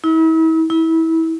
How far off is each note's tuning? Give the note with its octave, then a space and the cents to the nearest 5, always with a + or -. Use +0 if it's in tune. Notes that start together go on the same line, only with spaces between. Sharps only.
E4 -40
E4 -25